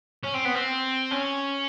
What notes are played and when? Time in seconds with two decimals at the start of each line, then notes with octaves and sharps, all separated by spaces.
0.23 C#4
0.34 C4
0.45 B3
0.55 C4
1.12 C#4